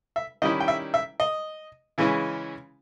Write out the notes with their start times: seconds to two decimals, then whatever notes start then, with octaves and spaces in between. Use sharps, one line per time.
0.16 E5
0.42 D#3 G3 C#4 E4 D#5
0.60 G5
0.68 E5
0.94 E5
1.20 D#5
1.98 C#3 E3 G#3 C#4 E4